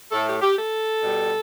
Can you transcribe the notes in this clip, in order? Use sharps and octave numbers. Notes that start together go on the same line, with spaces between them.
A2 A3 A4
G4
G4
A4
B2 G3